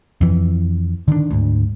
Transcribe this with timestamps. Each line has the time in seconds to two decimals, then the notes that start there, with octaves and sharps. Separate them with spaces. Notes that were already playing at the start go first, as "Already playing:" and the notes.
0.21 F2 E3
1.08 D3 D#3 D4
1.31 D2 G#2